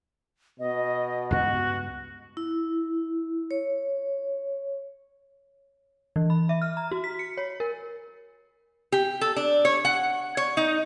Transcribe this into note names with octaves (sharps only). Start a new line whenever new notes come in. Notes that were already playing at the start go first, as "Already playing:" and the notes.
B2 D#5
C#2 G2 B3 F#4 F#6
E4
C#5
E3
B5
E5
F6
A#5
F#4
B6
C#7
C#5
A#4
G4
A4
D4
C#5
F#5
C#5
D#4